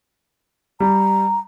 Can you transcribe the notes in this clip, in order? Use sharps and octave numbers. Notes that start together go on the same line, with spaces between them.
G3 A#5